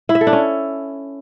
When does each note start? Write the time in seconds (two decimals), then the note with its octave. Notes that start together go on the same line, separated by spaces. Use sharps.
0.09 E4
0.15 E5
0.21 A4
0.27 D4
0.33 C#4